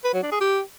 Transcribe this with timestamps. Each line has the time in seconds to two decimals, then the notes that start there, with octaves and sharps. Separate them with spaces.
0.04 B4
0.14 F#3
0.23 D4
0.32 G#4
0.41 G4